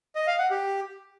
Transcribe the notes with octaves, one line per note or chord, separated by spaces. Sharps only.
D#5
F5
F#5
G4